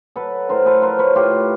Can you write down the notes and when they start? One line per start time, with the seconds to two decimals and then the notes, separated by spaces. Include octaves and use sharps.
0.16 F#3 A4 B4
0.49 A2 A#4 C5
0.66 A4 B4
0.82 F3 A#4 C5
0.99 B4 C#5
1.15 A2 F4 G4